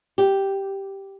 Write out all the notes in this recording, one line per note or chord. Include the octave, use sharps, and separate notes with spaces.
G4